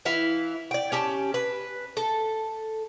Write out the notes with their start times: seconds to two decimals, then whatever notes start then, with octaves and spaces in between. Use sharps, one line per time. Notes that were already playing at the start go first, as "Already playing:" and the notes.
0.05 E3 E4 E5 F5
0.71 D5 G5
0.92 C#4 G4 A5
1.34 B4
1.97 A4